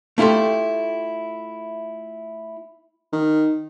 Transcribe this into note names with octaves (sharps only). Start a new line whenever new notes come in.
A3 E4 F4 G4 A4
D#3